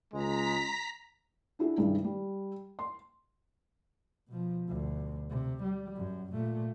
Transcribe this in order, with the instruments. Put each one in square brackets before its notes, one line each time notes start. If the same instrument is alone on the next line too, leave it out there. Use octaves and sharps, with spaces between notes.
[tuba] C#2 [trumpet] G#3 [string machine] A#5 B6
[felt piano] D4 E4 F#4 G#4
C2 G2 D#3 G#4
G3
C6
[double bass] B2 F3
D2 B2
C3
G3
F#2
A#2 A3